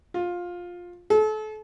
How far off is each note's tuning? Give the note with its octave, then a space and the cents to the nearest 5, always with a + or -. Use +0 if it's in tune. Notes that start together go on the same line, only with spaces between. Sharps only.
F4 +15
A4 -35